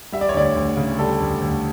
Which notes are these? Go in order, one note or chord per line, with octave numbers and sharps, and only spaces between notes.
G3 E5
D5
C#5
D2 D5
D2
C#3
G3 A4
D2
D2